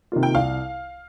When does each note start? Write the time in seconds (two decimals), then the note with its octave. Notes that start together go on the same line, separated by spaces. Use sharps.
0.12 C3 D#3 A#3 F4
0.23 G5
0.34 C2 F5